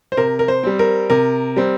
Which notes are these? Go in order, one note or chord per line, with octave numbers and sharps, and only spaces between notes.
C5
C3 A#4
A#4
C5
G3 C4
A#4
C3 A#4
G3 C4